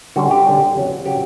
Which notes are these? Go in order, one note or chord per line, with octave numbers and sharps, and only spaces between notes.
D3 G3 C#4 F#4
G4
D3 G3 C#4
E2 C#3 F#3
C#3 F#3 G4